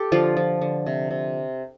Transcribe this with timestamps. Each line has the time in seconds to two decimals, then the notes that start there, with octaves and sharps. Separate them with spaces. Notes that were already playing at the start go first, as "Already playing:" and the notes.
Already playing: G4 A4
0.12 D3 F3 F4
0.37 F3
0.62 D3
0.86 C3
1.11 C3